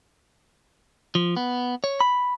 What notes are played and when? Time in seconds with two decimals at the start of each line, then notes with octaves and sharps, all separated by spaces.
1.15 F3
1.37 B3
1.84 C#5
2.01 B5